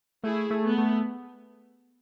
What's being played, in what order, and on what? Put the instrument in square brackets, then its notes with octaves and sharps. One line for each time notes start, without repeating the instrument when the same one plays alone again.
[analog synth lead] A3 [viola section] E4 G#4
[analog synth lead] A3
[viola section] B3
[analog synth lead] A3